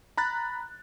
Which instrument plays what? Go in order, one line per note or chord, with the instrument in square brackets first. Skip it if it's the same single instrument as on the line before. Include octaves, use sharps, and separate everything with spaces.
[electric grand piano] A#5 B5 F#6 A6